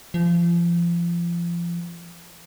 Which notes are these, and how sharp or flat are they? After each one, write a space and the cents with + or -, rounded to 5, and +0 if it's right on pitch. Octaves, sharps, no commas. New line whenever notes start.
F3 -30